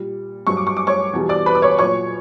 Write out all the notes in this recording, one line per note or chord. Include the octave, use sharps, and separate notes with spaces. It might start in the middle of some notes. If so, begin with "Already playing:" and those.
Already playing: A#2 G3
G2 F#3 C#6
D6
C#6
D6
C#5 C#6
E2 B2 G3
D5 D6
B4 B5
D6
C#5 C#6
A#2 F#3 C#5 C#6